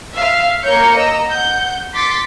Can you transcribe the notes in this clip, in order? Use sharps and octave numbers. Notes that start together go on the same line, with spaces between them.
E5 F5
A#3 A#4 C#5 G6 C#7
D#5 A#5 E6
F#5 G6
C6 D6 A6 B6 C#7